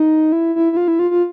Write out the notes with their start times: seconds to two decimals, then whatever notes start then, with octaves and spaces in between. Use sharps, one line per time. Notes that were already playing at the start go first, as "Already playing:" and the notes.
Already playing: D#4
0.32 E4
0.55 E4
0.72 E4
0.77 F4
0.88 E4
0.99 F4
1.11 F4